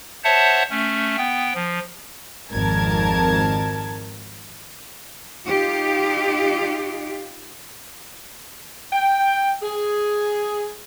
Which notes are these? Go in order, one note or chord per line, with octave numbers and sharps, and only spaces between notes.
C5 C#5 E5 F#5 A5
A3 C#4
B3 G5
F3
G#1 F2 A#4 A5 G#6
D#4 F4 G4
G5
G#4